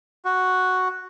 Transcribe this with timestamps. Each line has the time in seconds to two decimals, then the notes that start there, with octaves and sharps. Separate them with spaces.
0.25 F#4